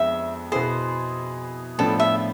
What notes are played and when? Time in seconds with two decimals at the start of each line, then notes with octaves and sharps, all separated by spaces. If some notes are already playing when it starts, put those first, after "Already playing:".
Already playing: F2 G#3 B3 D4 E5
0.52 B2 B3 E4 G#4 C5
1.78 A2 F3 B3 D4 A4
2.00 E5